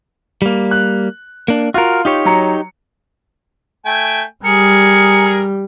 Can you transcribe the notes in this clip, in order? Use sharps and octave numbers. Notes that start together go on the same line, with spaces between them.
G3 A#3
F#6
A#3 D4
F4 F#4 A#4
D#4 G4 C#5
F#3 A#5 C#7
A3 G5 G#5
G3 G#4 A#4 C#7